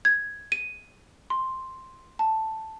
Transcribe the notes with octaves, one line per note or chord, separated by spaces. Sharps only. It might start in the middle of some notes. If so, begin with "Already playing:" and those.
G#6
D#7
C6
A5